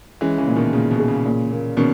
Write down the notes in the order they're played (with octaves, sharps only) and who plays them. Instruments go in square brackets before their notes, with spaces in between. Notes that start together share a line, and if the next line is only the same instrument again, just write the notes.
[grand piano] E3 G#3 [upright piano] C#4
[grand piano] C#3 E3
[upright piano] A#2
[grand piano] B2 D#3
[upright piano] A#2 [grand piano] C#3
[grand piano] B2
[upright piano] G#4
[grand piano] C#3
[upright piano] A#2
A#3
[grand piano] B2 D#3 [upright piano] C#4